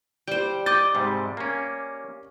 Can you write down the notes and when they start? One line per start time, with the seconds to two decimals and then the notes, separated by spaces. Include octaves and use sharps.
0.28 G3 C5 G5
0.66 D#5 D6 G6 A6
0.95 G#2 C3 G3
1.37 A#3 C#4